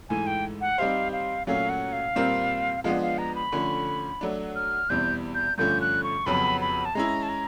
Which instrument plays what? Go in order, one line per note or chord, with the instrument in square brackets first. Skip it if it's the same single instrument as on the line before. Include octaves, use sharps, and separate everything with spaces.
[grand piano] G#2 E3 A3 [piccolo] G#5
[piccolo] G5
F#5
[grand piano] G3 C4 D#4 G4 C5 [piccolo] F5
[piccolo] F5
[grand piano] A#2 F#3 A3 C#4 [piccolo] F5
[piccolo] F#5
F5
[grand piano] A#2 G3 C4 F4 A#4
[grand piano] F3 G#3 B3 D4 [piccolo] F5
[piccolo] F5
A#5
B5
[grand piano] D3 F3 A3 C#4
F#3 A3 D4
[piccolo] F6
[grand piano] E2 B2 G3 C4 [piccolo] G6
[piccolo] G6
[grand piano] G2 D3 F3 A3 C#4 [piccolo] G6
[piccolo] F#6
C#6
[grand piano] F2 C#3 F#3 B3 [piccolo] B5
[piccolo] B5
A5
[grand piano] G#3 C#4 E4 [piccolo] A#5
[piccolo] A5
A#5